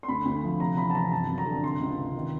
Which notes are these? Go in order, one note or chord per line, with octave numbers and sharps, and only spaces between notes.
C6
D2 B5
D2
F3
C3 A#5
E3 B5
A5
C3 A#5
G1 A5
F#2
A#5
D3
C3 C6
C#2
C3
D#3